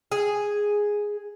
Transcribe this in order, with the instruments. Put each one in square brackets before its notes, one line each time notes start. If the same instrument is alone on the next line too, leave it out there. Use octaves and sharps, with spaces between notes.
[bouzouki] G#4